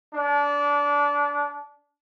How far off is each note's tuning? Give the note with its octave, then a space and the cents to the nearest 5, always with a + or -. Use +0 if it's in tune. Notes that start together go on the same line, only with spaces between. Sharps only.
D4 -25